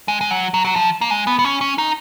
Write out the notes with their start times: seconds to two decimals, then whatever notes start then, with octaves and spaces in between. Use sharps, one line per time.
0.08 G#3
0.21 G#3
0.31 F#3
0.54 F#3
0.65 F#3
0.76 F3
1.01 A#3
1.10 G#3
1.27 B3
1.39 B3
1.45 C#4
1.61 C#4
1.78 D#4